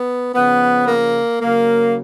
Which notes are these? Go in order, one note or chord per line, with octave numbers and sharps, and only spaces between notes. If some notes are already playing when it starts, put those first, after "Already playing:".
Already playing: B3
C#3 F3 B3
A#3
C#3 F#3 A#3